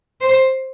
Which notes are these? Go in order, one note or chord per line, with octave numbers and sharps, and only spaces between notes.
C5